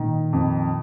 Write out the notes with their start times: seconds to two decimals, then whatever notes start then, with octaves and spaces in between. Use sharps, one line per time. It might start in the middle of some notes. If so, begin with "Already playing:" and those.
Already playing: A#2 D#3
0.33 F2